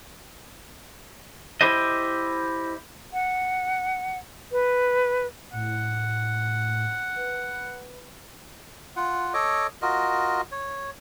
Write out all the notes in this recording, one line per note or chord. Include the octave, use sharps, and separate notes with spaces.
E4 G4 C5 D#5
F#5
B4
A2 F#5
B4
F4 F#5
A4 C#5 D#5 D6
F4 F#4 A#4 D#5
C#5